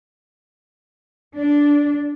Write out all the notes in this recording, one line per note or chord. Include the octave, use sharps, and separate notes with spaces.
D4